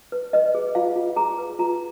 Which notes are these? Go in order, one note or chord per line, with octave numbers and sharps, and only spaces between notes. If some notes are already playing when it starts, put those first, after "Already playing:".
B4
B4 D#5
G#4
F4 F5
F4
G#4 A#5
B4
F4 A#5